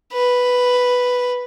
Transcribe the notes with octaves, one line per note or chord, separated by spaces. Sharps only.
B4